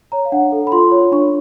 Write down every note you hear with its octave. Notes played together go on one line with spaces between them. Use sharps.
C#5 A#5
F5
D4 F#5
A4
B5
F4 C6
C#5
D4 C#6